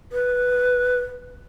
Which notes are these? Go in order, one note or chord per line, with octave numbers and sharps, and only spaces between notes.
B4